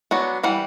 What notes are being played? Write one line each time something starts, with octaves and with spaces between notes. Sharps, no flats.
F#3 B3 D4
E3 G3 F#5